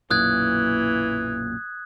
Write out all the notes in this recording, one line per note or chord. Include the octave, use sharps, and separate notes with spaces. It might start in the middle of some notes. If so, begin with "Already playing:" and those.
B1 F#2 A#2 E3 A#3 D#6 F#6 G#6